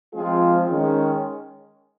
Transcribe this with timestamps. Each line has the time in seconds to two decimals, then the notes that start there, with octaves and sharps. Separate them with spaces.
0.13 F3 G#3 C4 F4 G#4
0.67 D#3 G#3 C#4